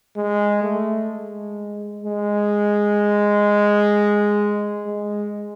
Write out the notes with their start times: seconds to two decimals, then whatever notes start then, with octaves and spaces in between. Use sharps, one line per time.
0.17 G#3
0.63 A3
1.10 G#3
2.04 G#3
4.86 G#3